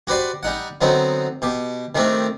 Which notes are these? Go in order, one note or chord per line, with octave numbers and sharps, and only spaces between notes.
F#4 G4 B4 C5 D5
G3 D#4 F#5
D3 F#3 B3 C4 D#4
B2 G4
D#3 G3 A3 C4 D4